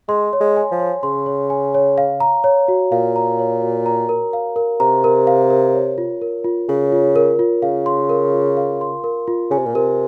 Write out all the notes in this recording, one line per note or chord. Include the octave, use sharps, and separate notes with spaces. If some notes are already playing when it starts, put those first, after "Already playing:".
G#3 C6
C#5
G#3
G#5
F3
C#5
C#3 C6
C#5
G#5
C#5
F5
A#5
C#5
F#4
A#2 F5
A#5
C#5
F#4
A#5
A#4
F5
A#4
C3 A#5
A#4
F5
A#4
C#5
F4
A#4
F4
C#3 C#5
F4
A#4
F4
C#3 F5
C6
A#4
F4
F5
C6
A#4
F4
C#3 G#5
C3
A#2
C3 A#4